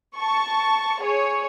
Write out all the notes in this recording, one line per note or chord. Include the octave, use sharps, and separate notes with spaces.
A5 C#6
G#4 C#5